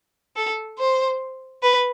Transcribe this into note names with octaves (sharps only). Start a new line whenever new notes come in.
A4
C5
B4